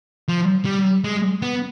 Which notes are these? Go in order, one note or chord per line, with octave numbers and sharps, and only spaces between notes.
F3
G3
G#3
B3